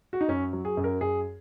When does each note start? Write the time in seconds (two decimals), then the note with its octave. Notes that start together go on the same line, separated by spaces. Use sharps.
0.13 F#4
0.21 D#4
0.28 F#2 C#4
0.53 F#3
0.65 G#4
0.77 F#2
0.84 A#4
1.01 F#2 G#4